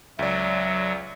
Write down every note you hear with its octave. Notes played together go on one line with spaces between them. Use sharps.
C#2 F#3 D5 E5